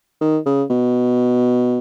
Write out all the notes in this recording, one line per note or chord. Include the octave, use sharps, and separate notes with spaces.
D#3
C#3
B2